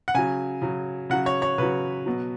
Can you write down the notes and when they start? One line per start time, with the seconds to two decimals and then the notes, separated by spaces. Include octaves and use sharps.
0.08 F#5
0.14 C#3 F#3 G#5
0.62 C#3 F#3
1.10 C#3 F#3 F#5
1.26 C#5
1.42 C#5
1.58 C#3 F#3 B4
2.06 B2 F#3